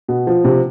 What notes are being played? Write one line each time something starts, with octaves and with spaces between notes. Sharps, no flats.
B2
F3
C3